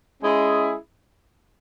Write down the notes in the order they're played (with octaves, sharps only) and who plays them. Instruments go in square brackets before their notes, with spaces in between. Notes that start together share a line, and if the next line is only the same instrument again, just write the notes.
[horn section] G#3 C#4 E4 G#4